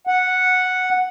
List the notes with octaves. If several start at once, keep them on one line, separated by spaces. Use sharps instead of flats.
F#5